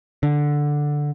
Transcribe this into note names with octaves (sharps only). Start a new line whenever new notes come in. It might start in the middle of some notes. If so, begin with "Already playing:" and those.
D3